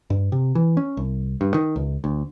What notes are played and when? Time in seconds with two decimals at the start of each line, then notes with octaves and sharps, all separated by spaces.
0.10 G2
0.32 C3
0.55 E3
0.77 C#4
0.97 C2
1.41 G2
1.54 D#3
1.76 C#2
2.04 D2